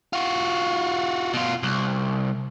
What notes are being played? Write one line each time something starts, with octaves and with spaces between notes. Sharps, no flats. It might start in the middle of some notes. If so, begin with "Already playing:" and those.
F4 F#4
B2 F4
C2